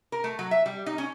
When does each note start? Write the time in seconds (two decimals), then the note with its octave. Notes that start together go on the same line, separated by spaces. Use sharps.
0.12 A#4
0.24 A3
0.39 F#3
0.51 E5
0.66 G3
0.86 D#4
0.98 C#4